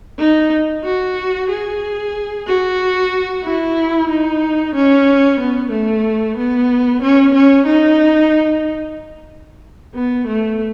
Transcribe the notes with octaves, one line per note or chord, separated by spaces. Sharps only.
D#4
F#4
G#4
F#4
E4
D#4
C#4
B3
A3
B3
C#4
C#4
D#4
B3
A3